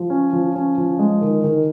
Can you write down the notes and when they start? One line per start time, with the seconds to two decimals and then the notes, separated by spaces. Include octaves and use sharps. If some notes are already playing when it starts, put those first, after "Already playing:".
Already playing: F3
0.10 C#4
0.33 F3
0.55 C#4
0.77 F3
0.99 G#3
1.21 D#3
1.44 D#3